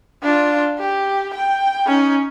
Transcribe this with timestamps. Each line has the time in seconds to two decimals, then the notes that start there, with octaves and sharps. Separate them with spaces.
0.23 D4 F4
0.78 G4
1.34 G5
1.87 C#4 D#4